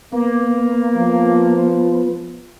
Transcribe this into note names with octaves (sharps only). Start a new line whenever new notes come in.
A#3 B3
F3